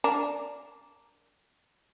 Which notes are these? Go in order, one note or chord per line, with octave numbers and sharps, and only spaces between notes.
D4 A#4